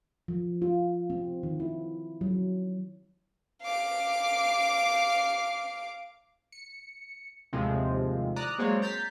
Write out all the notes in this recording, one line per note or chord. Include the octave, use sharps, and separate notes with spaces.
F3
F4
C4
D#3
E4
F#3
F5 D6
C#7
D#2 A2 C3 F3 G#3 C4
D5 A#5 D#6 F#6
F#3 G#3 A#3 C4 C#5 D5
A#5 G6 A6 B6 C7